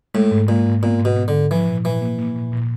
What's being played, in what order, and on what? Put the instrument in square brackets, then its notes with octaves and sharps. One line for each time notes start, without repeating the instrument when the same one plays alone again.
[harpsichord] A2 [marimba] G#3
[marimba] G#2
[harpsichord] A#2 [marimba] G#3
[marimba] G#2
[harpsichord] A#2 [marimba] B3
[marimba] G#2
[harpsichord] B2
[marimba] B3
[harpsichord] D3
[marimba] G#2
[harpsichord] E3 [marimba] F3
[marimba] A#2
[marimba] A#2 [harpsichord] E3
[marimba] A#3
A#3
A#2
A#2